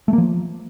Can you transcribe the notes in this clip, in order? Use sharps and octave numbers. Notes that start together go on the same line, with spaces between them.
A3
A#3
F3